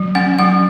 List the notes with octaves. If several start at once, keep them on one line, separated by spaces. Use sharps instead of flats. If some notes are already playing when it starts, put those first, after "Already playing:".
Already playing: F#3
C#4 F#5
F#3 F#5